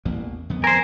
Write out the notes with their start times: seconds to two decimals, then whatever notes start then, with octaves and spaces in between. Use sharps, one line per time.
0.05 A1 E2 A#3
0.50 F2 D#3 B3
0.64 A#4 C5 G#5